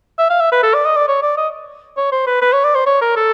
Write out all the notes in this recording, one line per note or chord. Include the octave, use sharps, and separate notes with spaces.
E5
F5
E5
B4
A4
D5
D#5
D5
C#5
D5
D#5
C#5
C5
B4
B4
C#5
D5
C5
C#5
A#4
A4